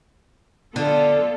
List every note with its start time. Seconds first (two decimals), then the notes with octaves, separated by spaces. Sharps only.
0.76 D3 B3 F4 A4